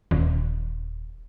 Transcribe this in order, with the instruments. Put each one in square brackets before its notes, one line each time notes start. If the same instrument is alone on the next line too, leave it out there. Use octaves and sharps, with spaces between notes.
[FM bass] D#1